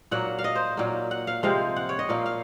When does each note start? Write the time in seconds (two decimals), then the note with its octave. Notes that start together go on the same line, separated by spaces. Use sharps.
0.11 A#2 F#3 A#3 F#5
0.39 F5
0.44 D#5
0.55 C5
0.77 A#2 F#3 A#3
1.11 F#5
1.27 F5
1.43 C3 F3 G#3 F5
1.76 F#5
1.89 C#5
1.99 D#5
2.09 A#2 F3 A#3 F5
2.26 F5